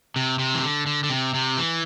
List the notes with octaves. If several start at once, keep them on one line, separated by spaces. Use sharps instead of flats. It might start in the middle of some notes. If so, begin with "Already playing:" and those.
C3
C3
E3
D3
D3
D3
C3
C3
E3